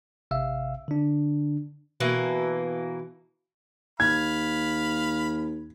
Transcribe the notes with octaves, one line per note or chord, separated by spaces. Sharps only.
A1 C3 E5 F5 E6
D3 D4
B2 E3 A#3
D#2 F5 B5 G#6